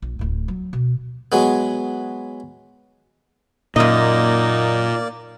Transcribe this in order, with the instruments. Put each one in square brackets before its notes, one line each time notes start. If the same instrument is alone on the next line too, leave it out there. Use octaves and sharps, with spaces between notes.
[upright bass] A#1
D1 A2
F#3
B2
[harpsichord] F#3 G#3 B3
[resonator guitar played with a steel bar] F#2 D#5 [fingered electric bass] A#2 [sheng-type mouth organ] A#3 D5 [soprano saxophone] D#4